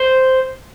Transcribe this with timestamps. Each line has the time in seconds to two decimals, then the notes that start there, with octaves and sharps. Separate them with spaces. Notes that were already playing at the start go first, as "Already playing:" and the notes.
Already playing: C5